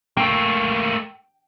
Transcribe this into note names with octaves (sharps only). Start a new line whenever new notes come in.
A3 A#3 G5